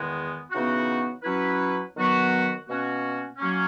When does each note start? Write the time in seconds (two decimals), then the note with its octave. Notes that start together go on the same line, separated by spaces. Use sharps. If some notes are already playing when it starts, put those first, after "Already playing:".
Already playing: E2 D#3 G#3 B3
0.51 C#3 E3 B3 D#4 F#4
1.23 F#3 C#4 E4 B4
1.95 D#3 F#3 B3 F#4 B4
2.67 B2 A#3 C#4 F#4
3.38 F#3 A#3 C#4